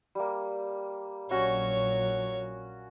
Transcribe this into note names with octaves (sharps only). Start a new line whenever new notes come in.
G3 A#3
A#1 F#3 C#4 F#4 C#5